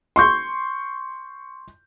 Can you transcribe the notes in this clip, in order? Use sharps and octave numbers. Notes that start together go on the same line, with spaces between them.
C6 C#6 G6